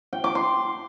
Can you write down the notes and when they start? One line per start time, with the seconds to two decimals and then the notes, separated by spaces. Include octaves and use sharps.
0.13 G5
0.24 D6
0.35 C6